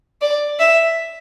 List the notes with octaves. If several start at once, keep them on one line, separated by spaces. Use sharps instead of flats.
D5
E5